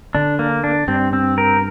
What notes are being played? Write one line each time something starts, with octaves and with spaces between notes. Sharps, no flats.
D3 D4
A#3
D4
G2 C4
C4
A#4